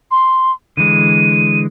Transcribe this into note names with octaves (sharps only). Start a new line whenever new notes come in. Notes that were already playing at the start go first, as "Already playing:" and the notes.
C6
D3 E3 G#3 D#7